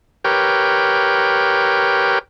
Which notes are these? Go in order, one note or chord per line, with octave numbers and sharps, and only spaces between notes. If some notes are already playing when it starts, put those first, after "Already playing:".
G4 A#4 B4 C#5 G5